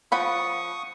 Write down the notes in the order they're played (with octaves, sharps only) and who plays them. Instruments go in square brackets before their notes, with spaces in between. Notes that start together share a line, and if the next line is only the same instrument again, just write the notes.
[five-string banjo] F3 F#5 B5 [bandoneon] C#6 D#6